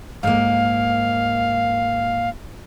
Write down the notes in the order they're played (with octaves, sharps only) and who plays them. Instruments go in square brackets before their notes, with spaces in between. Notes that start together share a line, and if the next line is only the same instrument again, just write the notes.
[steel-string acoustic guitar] G#2 A#3 [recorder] F5